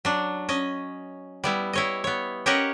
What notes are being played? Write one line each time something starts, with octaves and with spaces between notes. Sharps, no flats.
F#3 D4
C#4 D#5
G3 B3 E4
E4 C#5 D#5
B3 C#5
C#4 G4 A#4 C#5 D#5 F#5